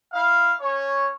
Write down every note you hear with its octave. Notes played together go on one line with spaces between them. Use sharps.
E4 F5
C#4 C#5